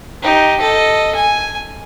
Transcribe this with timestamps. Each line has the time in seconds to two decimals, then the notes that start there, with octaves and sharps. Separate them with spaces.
0.22 D#4 G4
0.60 A4 D#5
1.15 G#5